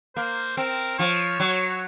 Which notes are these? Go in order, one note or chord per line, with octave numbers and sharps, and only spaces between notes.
A#3 C5
C4 A#4
F3 C#5
F#3